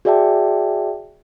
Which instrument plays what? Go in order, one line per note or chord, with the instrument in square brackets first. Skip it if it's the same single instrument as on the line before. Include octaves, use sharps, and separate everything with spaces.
[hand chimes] F#4 G#4 D5 E5 G5 A5